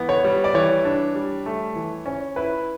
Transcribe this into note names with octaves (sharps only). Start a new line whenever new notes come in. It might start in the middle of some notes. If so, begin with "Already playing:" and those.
Already playing: E3 B3
C#5
G3
D5
E3 C#5
D4
G3
A3
E3
C#4
E4 B4